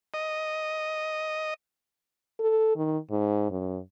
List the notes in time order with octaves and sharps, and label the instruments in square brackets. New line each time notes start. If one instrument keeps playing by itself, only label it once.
[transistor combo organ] D#5
[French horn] A4
D#3
G#2
F#2